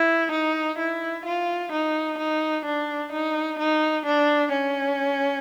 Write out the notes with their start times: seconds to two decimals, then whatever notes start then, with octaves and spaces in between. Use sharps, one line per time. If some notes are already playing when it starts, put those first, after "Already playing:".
Already playing: E4
0.32 D#4
0.79 E4
1.25 F4
1.72 D#4
2.19 D#4
2.65 D4
3.12 D#4
3.59 D#4
4.06 D4
4.53 C#4